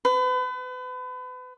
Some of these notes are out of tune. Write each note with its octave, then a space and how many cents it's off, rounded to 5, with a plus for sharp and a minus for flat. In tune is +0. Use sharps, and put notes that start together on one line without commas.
B4 +35